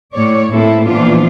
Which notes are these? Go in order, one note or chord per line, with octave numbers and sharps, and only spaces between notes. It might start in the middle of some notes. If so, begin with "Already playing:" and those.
A2 C#5 D5
A2 A3 A#3 C4 E4 A4
A#2 E3 F3 B3 D4 F4